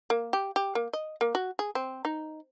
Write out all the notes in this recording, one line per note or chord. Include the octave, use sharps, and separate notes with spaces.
A#3
G4
G4
A#3
D#5
A#3
F#4
G#4
C4
D#4